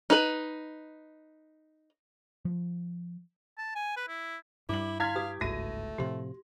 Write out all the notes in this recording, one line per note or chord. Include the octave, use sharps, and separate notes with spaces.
D#4 B4
F3
A5
G#5
B4
E4
G2 G3 E4 D6 F#7
E4 F5 C6 F6 G#6 B6
G4 B4 D#6
G1 C#2 G#2 A3 F#4 A#6 D#7
A2 C3 F3 G4 C6